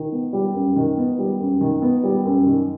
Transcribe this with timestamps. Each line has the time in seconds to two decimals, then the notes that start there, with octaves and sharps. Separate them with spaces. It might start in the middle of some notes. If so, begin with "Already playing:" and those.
Already playing: D#3
0.12 B3
0.33 G3
0.54 F#2
0.76 D#3
0.97 B3
1.19 G3
1.40 F#2
1.61 D#3
1.82 B3
2.04 G3
2.25 F#2
2.46 D#3